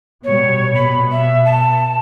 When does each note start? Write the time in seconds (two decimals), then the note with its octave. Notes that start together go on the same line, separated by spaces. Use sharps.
0.24 B2 G3 C#5
0.74 B2 B5
1.12 E5
1.45 A5